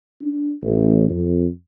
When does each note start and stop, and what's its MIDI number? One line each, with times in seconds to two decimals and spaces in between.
0.22 0.51 62
0.63 1.08 33
1.09 1.47 41